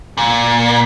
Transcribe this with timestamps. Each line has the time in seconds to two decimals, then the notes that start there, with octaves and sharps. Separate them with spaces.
0.18 A#2